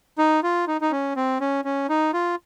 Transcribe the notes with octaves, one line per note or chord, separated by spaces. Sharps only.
D#4
F4
D#4
D#4
C#4
C4
C#4
C#4
D#4
F4